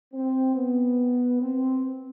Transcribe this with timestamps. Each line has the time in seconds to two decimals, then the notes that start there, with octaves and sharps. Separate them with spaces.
0.14 C4
0.56 B3
1.42 C4